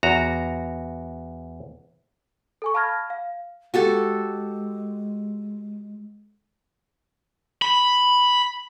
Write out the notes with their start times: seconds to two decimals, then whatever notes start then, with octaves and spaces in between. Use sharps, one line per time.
0.03 E2 F#4 A#5
2.62 A4 G#5 C#6
2.74 F5 A5 B5 F6 G#6 A#6
3.10 F5
3.74 G#3 F#4 G4 A4
7.62 B5